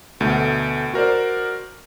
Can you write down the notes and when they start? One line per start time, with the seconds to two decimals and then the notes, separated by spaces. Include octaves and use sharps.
0.21 D2 B2 A3
0.94 F#4 A#4 C5 D5